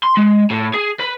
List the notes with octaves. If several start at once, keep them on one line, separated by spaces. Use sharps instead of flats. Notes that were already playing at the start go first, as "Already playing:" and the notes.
C6
G#3
A2
G#4
B4